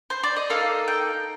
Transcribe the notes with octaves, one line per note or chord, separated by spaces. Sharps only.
C5
D5
D#5
A#3 D#4 A4 F5
G5